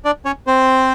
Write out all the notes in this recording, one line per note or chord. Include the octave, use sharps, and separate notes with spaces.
D4 D5
C#4 C#5
C4 C5